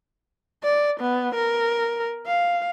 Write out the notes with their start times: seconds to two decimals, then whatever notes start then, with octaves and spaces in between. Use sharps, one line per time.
0.64 D5
1.00 B3
1.35 A#4
2.27 F5